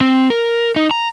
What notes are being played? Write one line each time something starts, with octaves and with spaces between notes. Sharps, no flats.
C4
A#4
D#4
A#5